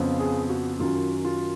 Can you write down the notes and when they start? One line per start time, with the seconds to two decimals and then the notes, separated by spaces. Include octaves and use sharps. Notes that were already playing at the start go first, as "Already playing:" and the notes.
Already playing: F2 C#3 F3 B3
0.19 G#4
0.49 F#4
0.79 F#2 D#3 F#3 C#4 F4
1.25 F4